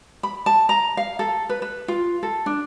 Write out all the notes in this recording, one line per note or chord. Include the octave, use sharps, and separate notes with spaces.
B5
A5
A#5
F5
A4
B4
B4
F4
A4
D4